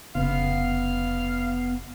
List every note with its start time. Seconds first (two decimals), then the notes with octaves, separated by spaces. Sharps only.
0.15 F1 C#3 B3 F5